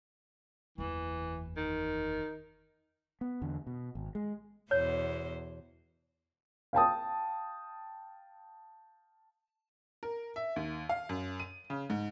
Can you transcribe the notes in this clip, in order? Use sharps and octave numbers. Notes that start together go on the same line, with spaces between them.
F#1 E2 E3
D#3
B3
E2 D3
B2
G#1
G#3
E2 B2 C5 C#5
F5 G5 A5 D#6
A#4
E5
D#2
F5
F#2
D#7
C#3
G#2